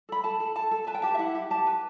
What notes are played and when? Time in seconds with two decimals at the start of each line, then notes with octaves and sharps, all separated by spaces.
0.09 A4 B5
0.24 A4 A5
0.40 A4
0.56 A4 A5
0.71 A4
0.87 B4 A5
0.94 G5
1.02 G4 A5
1.14 E5
1.19 E4 F#5
1.35 G4
1.51 G4 A5
1.66 B4